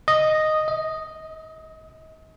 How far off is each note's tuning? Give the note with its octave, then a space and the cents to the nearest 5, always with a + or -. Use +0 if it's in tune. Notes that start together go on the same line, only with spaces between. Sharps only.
D#5 -5
D#5 +35